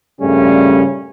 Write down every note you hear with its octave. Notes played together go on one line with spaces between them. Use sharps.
G2 A#2 C#3 G3 A3 C#4